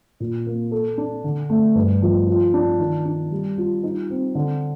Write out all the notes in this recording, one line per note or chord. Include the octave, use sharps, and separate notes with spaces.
A#2
A#3
A4
D4
D3
A3
G2
F3
F4
D4
D#3
D4
G3
F4
D#4
C4
D3